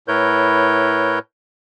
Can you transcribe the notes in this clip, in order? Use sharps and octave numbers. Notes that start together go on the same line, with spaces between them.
A2 E4 A#4 B4 C#5 G6